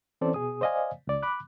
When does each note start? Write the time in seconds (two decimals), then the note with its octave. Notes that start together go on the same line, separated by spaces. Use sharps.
0.21 E3 C4 C#4 A4 C5 D5
0.34 B2 G#4 D#6
0.61 C5 D5 D#5 F5 G#5
1.07 C#2 D5
1.23 B5 D6 F#6